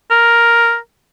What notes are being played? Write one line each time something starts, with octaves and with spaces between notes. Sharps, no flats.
A#4